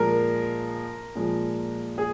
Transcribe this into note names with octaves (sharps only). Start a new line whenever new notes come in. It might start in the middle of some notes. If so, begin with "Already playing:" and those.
Already playing: A#2 F3 G#3 A#4
A#2 F3 G#3
G#4